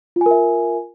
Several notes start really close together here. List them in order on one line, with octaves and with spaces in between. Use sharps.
F4 G#5 A#4 E5